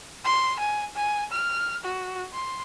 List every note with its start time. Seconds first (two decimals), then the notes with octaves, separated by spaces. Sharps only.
0.25 C6
0.59 G#5
0.96 G#5
1.31 F6
1.84 F#4
2.33 C6